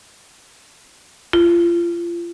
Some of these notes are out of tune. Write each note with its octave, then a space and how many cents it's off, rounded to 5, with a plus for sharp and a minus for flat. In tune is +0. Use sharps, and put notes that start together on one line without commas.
F4 -30